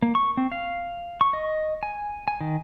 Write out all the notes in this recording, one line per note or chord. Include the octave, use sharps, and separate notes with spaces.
A#3
C#6
C4
F5
C#6
D#5
G#5
G#5
D#3